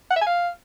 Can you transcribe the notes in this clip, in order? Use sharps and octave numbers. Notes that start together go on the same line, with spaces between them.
F#5
E5
G#5
F5